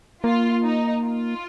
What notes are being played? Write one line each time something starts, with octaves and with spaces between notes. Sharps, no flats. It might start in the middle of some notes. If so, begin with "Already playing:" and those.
A#3 F4
D#4
F4